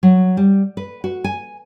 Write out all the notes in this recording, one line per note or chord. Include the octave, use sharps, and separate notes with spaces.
F#3
G3
B4
F#4
G#5